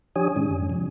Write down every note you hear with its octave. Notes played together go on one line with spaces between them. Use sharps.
F3 D4 G4 C#5 G#5 D#6
G#2 D#3 G#3 C#4 D4
F#2
C3 F3